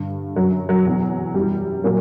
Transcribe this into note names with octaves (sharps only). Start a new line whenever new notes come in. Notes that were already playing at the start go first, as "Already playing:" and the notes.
Already playing: G2 D3
F#2 D3 F#3
F#3
E2 B2 F#3
F#2 E3 G3
A#2 F#3 A#3